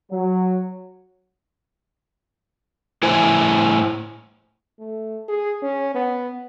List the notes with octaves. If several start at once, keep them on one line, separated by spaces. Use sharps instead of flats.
F#3
A2 E4 C5 G#5
A3
G#4
C#4
B3